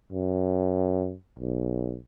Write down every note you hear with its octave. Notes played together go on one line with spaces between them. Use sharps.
F#2
B1